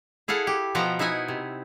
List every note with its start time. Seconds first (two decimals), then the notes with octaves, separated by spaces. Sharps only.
0.28 E4 G#4 A4 F5 F#5
0.47 G4
0.75 B2 F3 B3 F#5 G5 A#5
0.99 D#4 E4 E5 F#5 G#5
1.28 C3